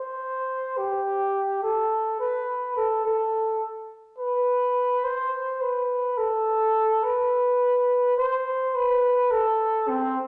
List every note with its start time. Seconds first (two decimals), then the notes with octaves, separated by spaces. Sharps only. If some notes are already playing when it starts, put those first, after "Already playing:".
Already playing: C5
0.78 G4
1.63 A4
2.20 B4
2.77 A4
3.05 A4
4.19 B4
5.04 C5
5.61 B4
6.18 A4
7.04 B4
8.18 C5
8.75 B4
9.31 A4
9.89 C4